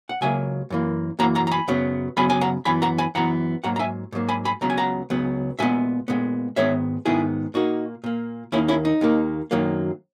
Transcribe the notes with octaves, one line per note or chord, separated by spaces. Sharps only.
F#5
C#2 C#3 F#3 A#3 E5 G#5
F#2 E3 A#3
F#2 E3 A#3 F#5 A#5
F#5 A#5
A#5
G#5 B5
F#2 C#3 F#3 B3
F#2 C#3 F#3 B3 G#5 B5
G#5
F#5 A#5
F#2 E3 B3 G#5 B5
F#5 A#5
G#5 B5
F#2 E3 B3 F#5 A#5
G#2 F#3 A#3 F#5 A#5
A#5
E5 G#5
G#2 F#3 A#3
G#5 B5
G#5 B5
C#2 C#3 F#3 B3 A#5
G#5
F#5 A#5
C#2 C#3 F#3 B3
A#2 G#3 B3 E5 G#5
A#2 G#3 B3
G#2 D#3 G#3 B3 C#5 E5
G#2 D#3 G#3 B3 E4 G#4
A#2 A#3 D#4 F#4
A#2 A#3
D#2 D#3 A#3 C#4 E4
C#4 E4
D#4
D#2 D#3 A#3
F#2 D#3 F#3 A#3